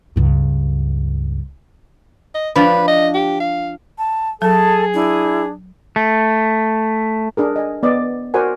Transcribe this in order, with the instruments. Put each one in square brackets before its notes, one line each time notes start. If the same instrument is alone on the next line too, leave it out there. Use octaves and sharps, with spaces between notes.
[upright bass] C#2 G2
[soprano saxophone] D#5
[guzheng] F3 D4 [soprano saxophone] B4
[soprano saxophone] D#5
G4
F5
[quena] A5
[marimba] F#3 [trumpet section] G#4 [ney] A4 [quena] A5
[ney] D4 [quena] E4
[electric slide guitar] A3
[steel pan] D4 G#4 A#4
D#5 G#5
B3 D5 D#5
F#4 A#4 C5 D5 F#5 G#5